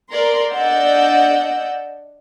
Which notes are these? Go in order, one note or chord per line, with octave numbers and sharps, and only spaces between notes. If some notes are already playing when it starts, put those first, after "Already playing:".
A#4 D5 A#5 C6
D4 D5 D#5 F#5 E6 G6